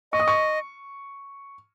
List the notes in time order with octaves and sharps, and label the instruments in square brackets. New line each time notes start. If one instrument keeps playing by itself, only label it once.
[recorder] D#5 [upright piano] C#6
[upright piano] D#6
C#6